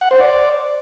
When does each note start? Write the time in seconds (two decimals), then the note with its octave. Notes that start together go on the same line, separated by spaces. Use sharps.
0.01 F#5
0.11 C5
0.21 D5